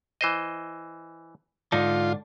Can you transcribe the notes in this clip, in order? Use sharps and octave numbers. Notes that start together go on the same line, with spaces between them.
E3 C5 D#5
G#2 D3 D4 D#4 F4